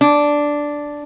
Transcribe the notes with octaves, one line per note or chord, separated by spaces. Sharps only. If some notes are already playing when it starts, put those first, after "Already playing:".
D4